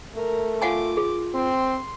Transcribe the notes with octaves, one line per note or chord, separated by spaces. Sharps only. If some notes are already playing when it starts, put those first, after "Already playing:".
A3 A#4
F4 F5 F#5 G#5 D6
G#4
C4 C6